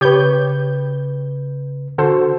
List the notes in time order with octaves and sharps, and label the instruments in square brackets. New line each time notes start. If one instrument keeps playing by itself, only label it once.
[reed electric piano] C#3 B4 [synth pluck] G4 C#5 G6
[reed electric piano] D3 [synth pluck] F#4 A4 C5